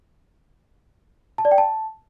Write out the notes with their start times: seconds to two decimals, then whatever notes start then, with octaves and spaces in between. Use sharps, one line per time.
1.38 A5
1.45 D5
1.51 G5
1.58 A5